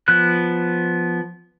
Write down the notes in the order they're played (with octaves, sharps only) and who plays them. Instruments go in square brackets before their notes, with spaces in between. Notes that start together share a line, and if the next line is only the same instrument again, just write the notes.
[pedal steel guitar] F3 B3 F#6